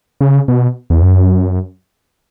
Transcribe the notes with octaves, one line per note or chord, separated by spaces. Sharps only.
C#3
B2
E2
F#2